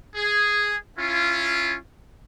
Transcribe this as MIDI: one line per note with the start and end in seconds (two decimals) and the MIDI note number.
0.15 0.74 68
0.98 1.75 61
0.98 1.75 64
0.98 1.75 65